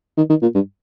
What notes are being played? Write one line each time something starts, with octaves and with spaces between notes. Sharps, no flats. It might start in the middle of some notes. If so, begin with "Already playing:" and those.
D#3
D#3
A#2
G2